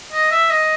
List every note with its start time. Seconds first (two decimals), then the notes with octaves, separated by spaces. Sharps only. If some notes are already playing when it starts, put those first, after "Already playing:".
0.13 D#5
0.31 E5
0.50 D#5